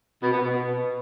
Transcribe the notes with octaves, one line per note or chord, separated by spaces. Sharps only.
B2
B3
B2